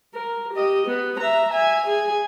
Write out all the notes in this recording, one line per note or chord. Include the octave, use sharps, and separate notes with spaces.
A#4
G4 D#5
B3
E5 A#5
E5 G#5
G#4 G#5